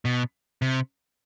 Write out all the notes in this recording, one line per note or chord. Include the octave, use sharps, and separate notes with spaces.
B2
C3